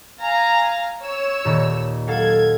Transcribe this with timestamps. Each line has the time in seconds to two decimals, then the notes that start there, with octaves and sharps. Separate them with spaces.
0.21 F5 G#5 A#5
1.01 C#5 E6
1.45 D#1 D#3
2.07 F#3 A4 F5 F#5 G#6